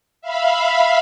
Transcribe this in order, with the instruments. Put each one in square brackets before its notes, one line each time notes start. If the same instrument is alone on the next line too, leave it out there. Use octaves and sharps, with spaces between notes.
[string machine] E5 F5 B5